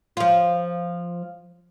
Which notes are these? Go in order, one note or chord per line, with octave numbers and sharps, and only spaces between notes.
F3 F4